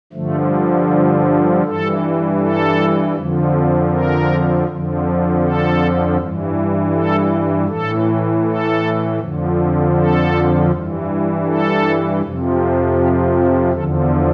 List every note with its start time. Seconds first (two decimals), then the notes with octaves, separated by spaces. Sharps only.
0.13 G2 D3 F3 A3
0.90 D4
1.65 G2 E3 A4
2.40 A4
3.16 F2 D3 F3
3.91 A#4
4.67 F2 D3 F3
5.42 A4
6.17 G2 E3
6.94 A4
7.68 A2 E3 A4
8.45 A4
9.20 F2 D3 F3
9.95 A4
10.71 G2 E3
11.47 A4
12.22 F2 C3 F3
12.97 G4
13.35 F4
13.73 E2 D3 F3 A4